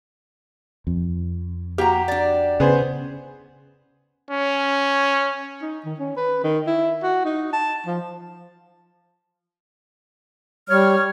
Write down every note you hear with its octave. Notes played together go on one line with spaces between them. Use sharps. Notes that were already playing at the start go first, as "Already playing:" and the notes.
F2
A#3 F#4 G4 A#5
D4 D5
C#3 B3 G#4 C5
C#4
D#4
D#3
C#4
B4
D#3
E4
F#4
D#4
A5
F3
G3 C#5 F6